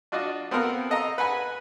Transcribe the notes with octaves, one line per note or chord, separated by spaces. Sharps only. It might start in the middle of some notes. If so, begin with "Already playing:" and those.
D4 F4 F#4 D5 D#5
B3 C4 A4 A#4 F5 F#5
A4 D#5 F5 A#5
B4 F#5 G#5 B5